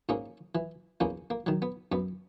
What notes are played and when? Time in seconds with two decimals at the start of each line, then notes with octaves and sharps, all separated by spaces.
0.09 G#2 A#3 C#4
0.55 E3
1.00 E2 A#3 C#4
1.30 A#3
1.46 D#3 F#3
1.62 B3
1.92 F#2 B3